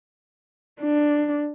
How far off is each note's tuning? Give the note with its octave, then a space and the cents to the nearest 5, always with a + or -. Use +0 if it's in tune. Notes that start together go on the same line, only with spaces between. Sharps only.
D4 +10